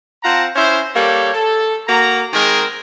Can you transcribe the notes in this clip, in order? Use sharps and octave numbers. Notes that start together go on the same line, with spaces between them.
C4 F4 F#5 A5 A#5
C#4 E4 C5
G3 A#3 A4 C#5
A4
A#3 F#4 A#5
D#3 G#3 C4 G#4 A#4